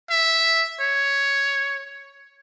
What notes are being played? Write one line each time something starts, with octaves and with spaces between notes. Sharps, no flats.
E5
C#5